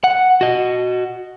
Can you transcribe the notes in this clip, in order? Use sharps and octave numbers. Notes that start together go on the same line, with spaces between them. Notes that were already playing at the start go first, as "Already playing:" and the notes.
F#5
F#4 D#5